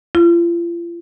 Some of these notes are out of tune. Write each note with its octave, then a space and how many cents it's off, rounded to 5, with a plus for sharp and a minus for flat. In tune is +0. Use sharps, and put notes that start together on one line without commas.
F4 -40